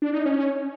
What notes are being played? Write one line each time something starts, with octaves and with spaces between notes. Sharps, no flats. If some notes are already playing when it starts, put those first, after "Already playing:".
D4
D#4
C#4